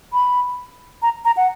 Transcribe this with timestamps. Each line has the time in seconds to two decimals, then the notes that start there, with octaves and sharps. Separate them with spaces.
0.13 B5
1.02 A#5
1.25 A#5
1.37 F#5